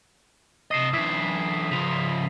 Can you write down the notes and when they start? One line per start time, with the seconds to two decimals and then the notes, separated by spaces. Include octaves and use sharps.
0.71 C3 D#5 D#6 C7 E7
0.93 D3 E3 E6 B6 E7
1.71 C#3 F3 B6 F7